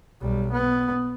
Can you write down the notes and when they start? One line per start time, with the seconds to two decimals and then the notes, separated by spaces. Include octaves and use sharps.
0.21 B1 G3
0.52 B3